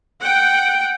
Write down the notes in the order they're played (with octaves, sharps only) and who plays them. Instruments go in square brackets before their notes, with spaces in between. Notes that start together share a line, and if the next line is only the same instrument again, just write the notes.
[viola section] F#5 G5